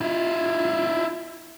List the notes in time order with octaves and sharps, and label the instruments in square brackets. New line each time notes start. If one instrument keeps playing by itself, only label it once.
[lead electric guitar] E4 F4